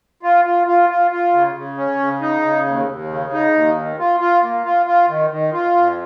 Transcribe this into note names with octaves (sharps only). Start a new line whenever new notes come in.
F4
F4
F4
F4
F4
C#3
C#3
C#4
C#3
D#4
C#3
D#2
D#2
C#3
D#4
D#2
D#3
F4
F4
A#3
F4
F4
D#3
D#3
F4
F2